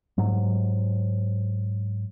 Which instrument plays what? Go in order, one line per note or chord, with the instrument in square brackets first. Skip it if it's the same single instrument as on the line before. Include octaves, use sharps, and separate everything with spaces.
[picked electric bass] G#2 F#3